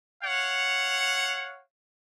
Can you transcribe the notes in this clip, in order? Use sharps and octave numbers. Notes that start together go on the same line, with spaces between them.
C#5 F5 F#5